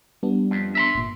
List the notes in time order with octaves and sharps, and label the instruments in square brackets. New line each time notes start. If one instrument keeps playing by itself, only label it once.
[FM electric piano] G3 B3 D4
[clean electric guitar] F2
E5 A#5 C6
[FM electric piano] G1 A#2